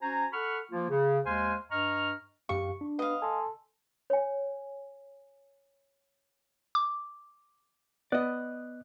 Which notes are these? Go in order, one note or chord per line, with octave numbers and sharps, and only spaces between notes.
C#4 F#4 C5 G#5 A#5
A4 F#5 B5 C#6 F6
F3 A#3 F4
C#3
D#2 G#3 C5 F5 G#5 C6
G2 D#5 A#5 C#6 F6
F#2 G4 F5 C#6
D4
B3 D#5 F5
A4 G#5 C6
C#5 G#5
D6
B3 D5 D#5 F#6